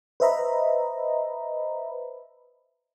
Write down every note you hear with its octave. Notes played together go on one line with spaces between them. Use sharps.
B4 C5 D#5 E5 A#5 B5